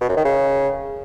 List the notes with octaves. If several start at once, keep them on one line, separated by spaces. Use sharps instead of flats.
B2
F#2
D#3
C#3